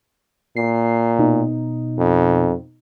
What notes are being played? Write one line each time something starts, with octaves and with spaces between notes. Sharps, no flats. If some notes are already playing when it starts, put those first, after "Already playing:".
A#2 C7
B2 D#4
F2